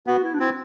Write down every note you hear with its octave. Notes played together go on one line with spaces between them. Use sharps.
B3 F#4
E4
D4
C4 E4